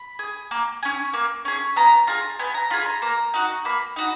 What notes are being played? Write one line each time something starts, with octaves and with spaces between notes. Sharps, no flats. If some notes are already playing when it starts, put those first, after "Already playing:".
Already playing: B5
G#4
A#3
C#4 G#4
A#3
C#4 G#4
B3 A#5
F4 G#4 A#5
B3 G#5
A#5
F4 G#4 B5
A#5
A#3 A#5
D#4 F#4
A#3 B5
D#4 F#4